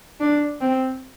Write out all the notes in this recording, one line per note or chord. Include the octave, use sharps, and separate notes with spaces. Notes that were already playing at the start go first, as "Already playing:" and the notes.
D4
C4